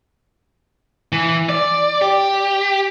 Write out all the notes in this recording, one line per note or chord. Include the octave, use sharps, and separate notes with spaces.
E3
D5
G4